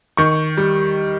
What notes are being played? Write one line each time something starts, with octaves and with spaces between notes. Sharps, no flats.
D#3 C#6
G3